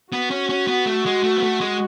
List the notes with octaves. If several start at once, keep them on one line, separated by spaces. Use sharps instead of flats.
B3 F#4
C#4
C#4
B3
A3
G#3
A3
B3
A3
G#3